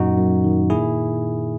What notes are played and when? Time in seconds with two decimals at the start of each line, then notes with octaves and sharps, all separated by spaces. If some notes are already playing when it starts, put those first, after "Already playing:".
Already playing: F#2 A#2 D#4 F#4
0.17 F#2
0.44 D#3
0.70 A#2 E4 G#4